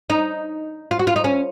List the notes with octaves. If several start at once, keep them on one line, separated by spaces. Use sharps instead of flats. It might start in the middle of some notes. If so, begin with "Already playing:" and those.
D#4
F4
F#4
F4
D#4
C#4